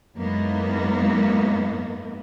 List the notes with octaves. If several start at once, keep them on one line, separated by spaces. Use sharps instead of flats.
F#2 A2 G#3 A#3 B3 D#4